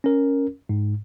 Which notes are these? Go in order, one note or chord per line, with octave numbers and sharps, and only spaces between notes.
C#4 A#4
G#2